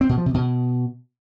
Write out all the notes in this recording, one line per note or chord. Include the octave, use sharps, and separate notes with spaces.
C4
B2
F3
C3
B2